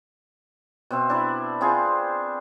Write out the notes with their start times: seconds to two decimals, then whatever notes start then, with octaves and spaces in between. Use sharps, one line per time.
0.91 B2 C4 E5
1.10 D4 E4
1.61 C4 F4 G#4 B4